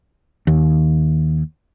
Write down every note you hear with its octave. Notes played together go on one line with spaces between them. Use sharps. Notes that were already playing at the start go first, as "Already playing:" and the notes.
D#2